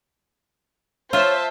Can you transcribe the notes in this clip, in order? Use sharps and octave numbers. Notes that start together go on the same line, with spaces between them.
F4 C5 C#5 E5 A5